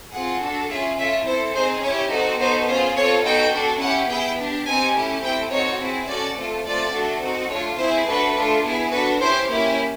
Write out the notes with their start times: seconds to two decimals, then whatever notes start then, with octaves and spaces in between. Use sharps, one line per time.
0.12 C4 F4 G#4 F#5
0.42 D4 F#4 A4
0.70 C#4 F4 G#4 E5
0.98 C#4 F4 A4 E5
1.26 C4 E4 A4 C5
1.54 C4 D#4 G#4 C5
1.83 C#4 E4 G4 C#5
2.11 C4 D#4 F#4 A4
2.40 B3 D#4 F#4 A4 C5
2.68 C#4 F4 G#4 C5
2.97 C4 F4 A4 C#5
3.25 B3 D#4 F#4 A4 G5
3.53 D4 F#4 A4
3.82 C#4 E4 G4 F#5
4.10 B3 E4 G#4 G5
4.39 D4 G4
4.67 C4 D#4 G4 G#5
4.95 A3 C#4 E4 G4
5.23 A3 C4 E4 G5
5.51 C4 D#4 F#4 A4 C#5
5.80 C4 E4 G#4
6.09 C#4 F#4 A4 D5
6.37 A3 C4 F4 A4
6.65 A3 C4 F4 A4 D5
6.93 A3 D4 F#4 A4
7.22 C4 D#4 F#4
7.51 A3 D4 F4 C#5
7.78 C4 E4 G#4 C5
8.07 A3 D4 F#4 A4 B4
8.36 A3 D4 F4 A4
8.64 B3 E4 G#4
8.92 D4 F#4 A4 B4
9.21 C#4 E4 G4 C5
9.49 A#3 C#4 E4 G4